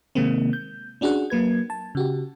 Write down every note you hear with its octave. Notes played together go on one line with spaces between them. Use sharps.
C3 D#3 G#3 A#3 C4
G6
C#4 D4 F#4 G#4 F#5
F#3 A#3 B4 G#6
A5
C#3 F#4 G4